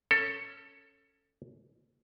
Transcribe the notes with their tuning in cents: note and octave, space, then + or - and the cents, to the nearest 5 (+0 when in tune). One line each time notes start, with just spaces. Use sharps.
C#4 +0 A4 +15